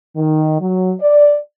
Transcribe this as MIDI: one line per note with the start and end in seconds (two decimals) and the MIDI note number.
0.16 0.58 51
0.61 0.93 54
1.01 1.35 74